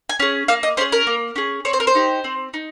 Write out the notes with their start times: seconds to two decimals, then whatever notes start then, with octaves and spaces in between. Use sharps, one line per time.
0.09 G#5
0.20 C#4 G#4
0.48 A#3 F5
0.63 D#5
0.77 C#4 G#4 C5
0.92 A#4
1.07 A#3
1.36 C#4 G#4
1.65 C4 C#5
1.73 C5
1.80 A#4
1.87 C5
1.95 D#4 G4
2.24 C4
2.54 D#4